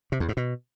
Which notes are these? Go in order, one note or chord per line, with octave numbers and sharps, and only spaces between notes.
C3
E2
G#2
B2